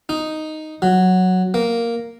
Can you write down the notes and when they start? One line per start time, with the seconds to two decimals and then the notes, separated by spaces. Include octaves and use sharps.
0.09 D#4
0.82 F#3
1.54 A#3